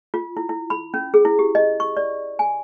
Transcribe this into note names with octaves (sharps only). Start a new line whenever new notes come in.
F4
E4
E4
B5
C#4
G#4
E4
G4
D#5
C#6
D5
G#5